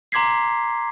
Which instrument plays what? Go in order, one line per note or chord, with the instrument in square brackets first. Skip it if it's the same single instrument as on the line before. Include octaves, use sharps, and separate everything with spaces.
[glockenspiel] A#5 C6 D6 G#6 B6 C7